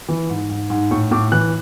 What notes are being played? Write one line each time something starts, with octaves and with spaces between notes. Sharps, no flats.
E3
G#2
G#2
G#2
A2 C#6
A2 D6
E3 F#6